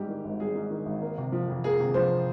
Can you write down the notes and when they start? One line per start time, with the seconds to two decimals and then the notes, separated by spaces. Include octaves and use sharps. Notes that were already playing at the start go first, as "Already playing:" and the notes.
Already playing: G#2 G3 G4
0.08 D#3
0.25 G#1
0.40 G3 G#4
0.55 G#2
0.70 D#3
0.86 G#1
1.02 A#3
1.18 C3
1.32 F3
1.48 F2
1.64 A#3 G#4
1.80 C3
1.94 F3 C5